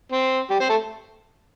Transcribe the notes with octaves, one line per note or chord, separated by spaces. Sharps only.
C4
G3 G4
C4 C5
A3 A4